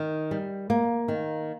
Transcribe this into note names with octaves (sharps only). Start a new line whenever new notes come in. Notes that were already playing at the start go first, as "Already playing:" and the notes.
Already playing: D#3
G3
A#3
D#3